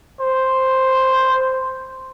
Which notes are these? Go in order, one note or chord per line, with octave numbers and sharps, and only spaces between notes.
C5